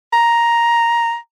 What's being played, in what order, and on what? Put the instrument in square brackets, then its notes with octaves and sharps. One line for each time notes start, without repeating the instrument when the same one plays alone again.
[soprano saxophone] A#5